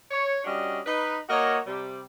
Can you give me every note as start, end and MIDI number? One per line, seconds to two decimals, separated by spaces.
0.11 0.44 73
0.45 0.79 55
0.45 0.79 61
0.45 0.79 62
0.45 0.79 66
0.45 0.79 75
0.86 1.18 63
0.86 1.18 71
1.29 1.57 58
1.29 1.57 66
1.29 1.57 70
1.29 1.57 73
1.29 1.57 75
1.66 2.02 48
1.66 2.02 55